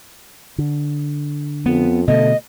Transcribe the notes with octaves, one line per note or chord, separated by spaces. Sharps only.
D3
F2 B3
B2 D3 A3 D#5